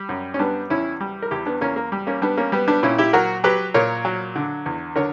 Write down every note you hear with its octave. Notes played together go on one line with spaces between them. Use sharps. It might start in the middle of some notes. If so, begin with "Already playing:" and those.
Already playing: G3
F#2
C#4
G3 B3 D4
E2 C#4 E4
G3
A#4
E2 E4 G4
B3 D4
E2 A#3 C#4
A#3
G3
A#3 C#4
G3 B3 D4
A#3 C#4
G3 B3
B3 D4
A#2 C#4 E4
E4 G4
F#3 F#4 A#4
F#3 G4 B4
A#2 A#4 C#5
F#3
D3
E2
D3 A#4 C#5